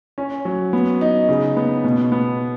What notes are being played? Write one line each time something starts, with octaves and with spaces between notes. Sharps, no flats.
C#4
F#3
B3
D#4
C#3
B3
B2
B3